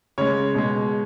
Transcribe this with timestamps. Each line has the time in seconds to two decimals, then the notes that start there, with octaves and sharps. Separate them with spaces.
0.18 C#3 G#3 C#5
0.55 B2 G#3